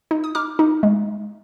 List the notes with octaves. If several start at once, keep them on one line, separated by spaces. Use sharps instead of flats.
D#4
D#6
D#4 D6 F6
D#4
G#3